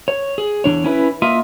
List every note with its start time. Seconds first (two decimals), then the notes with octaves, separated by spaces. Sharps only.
0.08 C#5
0.38 G#4
0.64 E2 C#3 D4 C#5
0.84 C#4 E4 A#4 B4
1.22 A#3 F4 D#5 E5